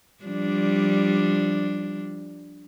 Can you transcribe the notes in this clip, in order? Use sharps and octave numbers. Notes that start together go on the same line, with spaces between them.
F3 G3 D4